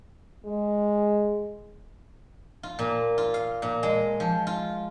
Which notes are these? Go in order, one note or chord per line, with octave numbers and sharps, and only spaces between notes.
G#3
F4
A#2
F4
F5
A#2
G#3
F3
F4